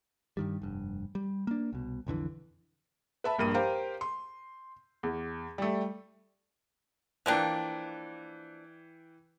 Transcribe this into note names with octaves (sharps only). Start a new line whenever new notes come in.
G2 D#3 G3
F1 G2
G3
A#3 D4
C2 B2
B1 F2 D3 E3
B4 E5 A5 B5
A#1 G2 A#3 D#7
G4 A#4 C5 F5
C6
E2
G3 A3
E3 F3 A#3 D4 G5 F#6